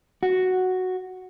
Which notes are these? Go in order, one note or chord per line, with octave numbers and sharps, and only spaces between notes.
F#4